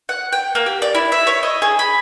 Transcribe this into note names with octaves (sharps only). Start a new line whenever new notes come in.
F#5
G5
A#3
G4
D5
E4
E5
C#5
D#5
G#4
B5